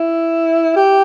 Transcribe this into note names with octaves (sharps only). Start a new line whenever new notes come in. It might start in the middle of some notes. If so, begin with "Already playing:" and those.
Already playing: E4
G4